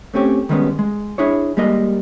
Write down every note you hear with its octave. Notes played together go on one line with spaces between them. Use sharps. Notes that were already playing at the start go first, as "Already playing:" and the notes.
A3 C4 C#4 G4 C#5
D#3 G3 G#3 A#3 B3 C#4
G#3
D4 E4 G#4 C#5
G3 G#3 A#3 A#4 D#5